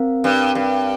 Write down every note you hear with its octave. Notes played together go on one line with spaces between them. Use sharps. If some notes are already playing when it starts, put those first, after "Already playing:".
Already playing: C4 A#4 F5
G2
G2